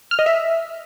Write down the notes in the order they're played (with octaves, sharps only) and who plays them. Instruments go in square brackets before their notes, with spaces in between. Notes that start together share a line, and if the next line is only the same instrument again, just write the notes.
[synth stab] F6
D#5
E5